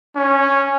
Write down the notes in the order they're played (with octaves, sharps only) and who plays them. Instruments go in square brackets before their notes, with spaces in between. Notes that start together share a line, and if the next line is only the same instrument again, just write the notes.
[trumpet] C#4